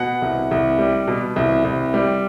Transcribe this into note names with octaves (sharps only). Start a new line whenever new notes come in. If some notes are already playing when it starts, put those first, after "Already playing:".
Already playing: B2 F#5
C2
C2
G3
B2
C2
C2
G3